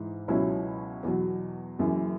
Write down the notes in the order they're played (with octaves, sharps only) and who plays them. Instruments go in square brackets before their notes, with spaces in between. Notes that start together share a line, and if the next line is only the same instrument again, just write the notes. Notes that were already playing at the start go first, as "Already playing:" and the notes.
Already playing: [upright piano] G#2 E3 D#4
C#2 B2 F#3 C#4 E4
E2 B2 F#3
F#1 F#2 E3